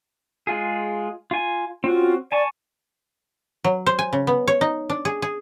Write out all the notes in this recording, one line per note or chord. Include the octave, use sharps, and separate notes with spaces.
G#3 F4 G#4
F4 G#5
C4 C#4 F4 F#4
D5 G#5 A5 C#6
F#3
C5
G#5
C#3
B3
C#5
D#4
D4
G#4
G#4